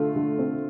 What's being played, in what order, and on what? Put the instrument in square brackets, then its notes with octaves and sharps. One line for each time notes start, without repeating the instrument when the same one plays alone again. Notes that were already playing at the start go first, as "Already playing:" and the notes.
Already playing: [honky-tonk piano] D3 A3 [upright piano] F4
[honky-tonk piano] D3
C4